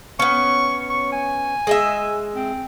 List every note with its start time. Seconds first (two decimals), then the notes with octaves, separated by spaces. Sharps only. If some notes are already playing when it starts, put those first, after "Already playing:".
0.19 B3 C#4 C#6
0.89 C#6
1.12 G#5
1.67 G#3 D#5 E5
2.36 C4